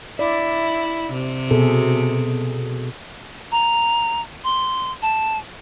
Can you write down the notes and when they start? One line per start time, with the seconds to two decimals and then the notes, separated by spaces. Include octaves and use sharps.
0.19 E4 D5
1.12 C3
1.51 B2 G#4 A4
3.52 A#5
4.44 C6
5.02 A5